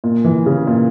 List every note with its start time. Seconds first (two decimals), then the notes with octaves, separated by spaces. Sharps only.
0.04 A#2
0.24 E3
0.46 C#3
0.67 A#2